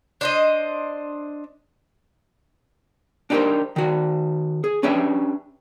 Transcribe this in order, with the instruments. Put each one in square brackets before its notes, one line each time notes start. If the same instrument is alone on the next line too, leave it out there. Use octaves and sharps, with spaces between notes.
[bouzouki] D4 C5 D#5
[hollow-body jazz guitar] D4 D#4 G4 G#4 A#4 C5
D#3 F#4
G#4
C#4 D4 G4 B4 E5